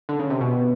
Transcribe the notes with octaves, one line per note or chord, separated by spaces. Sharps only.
D3
C#3
C3
B2